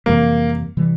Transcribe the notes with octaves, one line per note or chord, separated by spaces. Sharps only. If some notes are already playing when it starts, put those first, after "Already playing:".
F2 C3 E3 G3 A#3
C3 E3 G3